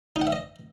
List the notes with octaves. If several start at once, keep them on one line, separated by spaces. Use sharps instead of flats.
D#4
F#5
E5
D#5